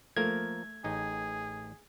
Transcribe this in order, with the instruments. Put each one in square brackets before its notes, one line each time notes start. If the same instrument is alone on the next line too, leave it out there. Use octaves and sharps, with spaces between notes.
[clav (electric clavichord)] F3 A#3 A#4 [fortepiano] A3 [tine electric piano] G#6
[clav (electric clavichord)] A1 D#4 [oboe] G#4